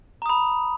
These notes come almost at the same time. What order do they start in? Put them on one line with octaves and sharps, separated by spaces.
A#5 D#6 B5